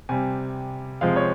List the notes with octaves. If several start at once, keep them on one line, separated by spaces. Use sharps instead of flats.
C3 G3 G#5
C3 F3 G#3 F5
C#5